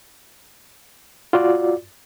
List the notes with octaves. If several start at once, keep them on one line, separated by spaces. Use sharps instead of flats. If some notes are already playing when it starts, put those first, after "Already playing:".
F4 F#4 D5